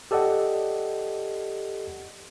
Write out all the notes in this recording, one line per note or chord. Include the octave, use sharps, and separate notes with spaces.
G4 A4 D5 D#5 F#5